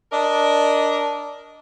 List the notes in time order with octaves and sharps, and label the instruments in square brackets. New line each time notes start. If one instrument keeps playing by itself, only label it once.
[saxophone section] D4 A#4 D5 D#5